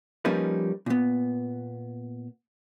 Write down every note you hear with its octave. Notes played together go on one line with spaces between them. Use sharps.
F3 G3 A#3 C#4 D#4 B4
A#2 B3